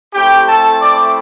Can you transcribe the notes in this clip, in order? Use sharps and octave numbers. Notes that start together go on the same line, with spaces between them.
A3 C4 E4 G4 G5
A4 A5
D5 D6